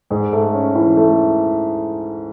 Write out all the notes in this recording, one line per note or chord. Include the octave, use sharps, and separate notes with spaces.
G#2
A3
C#4
E3
A3